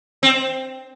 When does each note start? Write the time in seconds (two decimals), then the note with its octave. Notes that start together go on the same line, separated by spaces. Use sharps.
0.23 C4